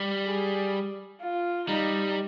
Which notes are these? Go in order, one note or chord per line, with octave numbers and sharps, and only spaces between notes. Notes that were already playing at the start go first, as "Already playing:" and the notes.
Already playing: G3
G#4
F4
G3 D#4